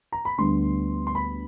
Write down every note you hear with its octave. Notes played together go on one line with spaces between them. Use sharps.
A#5
B5
D2 D3 G3 B3 D4 C6
C6
B5